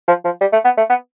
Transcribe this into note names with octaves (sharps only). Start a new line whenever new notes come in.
F3
F3
G3
A3
B3
A3
B3